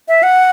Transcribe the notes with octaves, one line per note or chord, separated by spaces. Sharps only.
E5
F#5